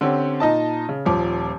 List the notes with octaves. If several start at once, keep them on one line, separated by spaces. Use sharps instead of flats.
D3 C4 C#4 G4
A#2 D#4 D#5 A5
C#3
D#1 F3 D6